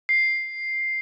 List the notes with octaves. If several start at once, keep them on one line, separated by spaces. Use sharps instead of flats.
C7